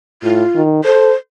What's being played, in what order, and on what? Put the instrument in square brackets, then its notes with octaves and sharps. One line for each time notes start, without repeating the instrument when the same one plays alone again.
[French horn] A2 [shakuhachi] F4
[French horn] D#3
[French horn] A4 [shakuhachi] C5